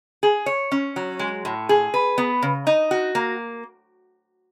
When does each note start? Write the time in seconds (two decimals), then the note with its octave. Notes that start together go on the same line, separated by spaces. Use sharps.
0.23 G#4
0.46 C#5
0.72 C#4
0.96 F#3
1.19 G#3
1.45 A2
1.69 G#4
1.94 B4
2.18 B3
2.42 C#3
2.67 D#4
2.91 F#4
3.15 A#3